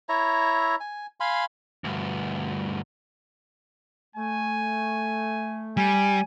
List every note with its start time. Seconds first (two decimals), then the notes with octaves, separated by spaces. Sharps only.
0.09 E4 C#5 E5 A#5
0.80 G#5
1.20 F5 G#5 B5 C6
1.84 D2 G2
4.16 A3 G#5
5.77 G3 G#5